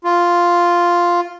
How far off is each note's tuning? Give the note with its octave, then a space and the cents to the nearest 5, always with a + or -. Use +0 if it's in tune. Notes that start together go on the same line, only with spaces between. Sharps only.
F4 +0